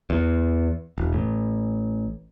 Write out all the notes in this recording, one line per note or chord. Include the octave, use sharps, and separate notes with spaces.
E2
E1
A1